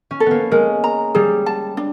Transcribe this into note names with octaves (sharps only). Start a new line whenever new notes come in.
C#4
A4
A#3 B3
G#3 A#4
A#5
G3 G#4
A5
D4